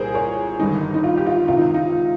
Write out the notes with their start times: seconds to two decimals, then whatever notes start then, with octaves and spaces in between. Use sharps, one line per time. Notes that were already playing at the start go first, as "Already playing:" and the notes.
Already playing: C2 A#2 G#4 A#4 C5
0.14 A#4 C#5
0.59 G1 G2 D#3 D#4
0.94 D#4
1.04 F4
1.17 G4
1.27 F4
1.48 C#2 C3 D#3 F4
1.57 D#4
1.74 D#4